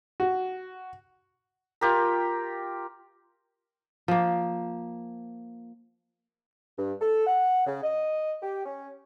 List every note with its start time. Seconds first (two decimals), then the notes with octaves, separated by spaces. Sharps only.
0.20 F#4
1.81 F4 G4 A#4
4.08 F3 A#3
6.78 G2
7.01 A4
7.27 F#5
7.66 C#3
7.83 D#5
8.41 G4
8.65 C#4